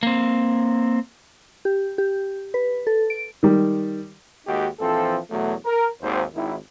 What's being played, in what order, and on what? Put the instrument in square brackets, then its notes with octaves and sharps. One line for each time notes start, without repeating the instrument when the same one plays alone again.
[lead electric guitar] A#3 C4
[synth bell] G4
G4
B4
A4
D7
[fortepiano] D#3 G3
[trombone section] D#2 G#3 A#3 D#4 F#4 G4
A#1 E3 F3 C4 A4
E2 B2 F#3 A3
A#4
G#1 D#2 C5
G#1 D#3 E4